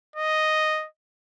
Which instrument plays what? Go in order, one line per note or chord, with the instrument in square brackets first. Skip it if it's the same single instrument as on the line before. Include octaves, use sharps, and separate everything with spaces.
[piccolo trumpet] D#5